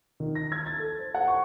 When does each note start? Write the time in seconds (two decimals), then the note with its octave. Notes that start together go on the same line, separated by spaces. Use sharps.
0.20 D#3
0.35 A#6
0.52 G#6
0.66 A6
0.79 A4
0.99 C5
1.14 F#5
1.28 C#6